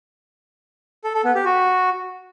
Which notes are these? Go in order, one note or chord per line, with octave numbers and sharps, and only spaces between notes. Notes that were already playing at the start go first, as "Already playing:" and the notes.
A4
A4
B3
G4
F#4